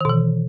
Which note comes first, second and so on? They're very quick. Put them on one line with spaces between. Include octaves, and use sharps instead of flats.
D#3 B2 E3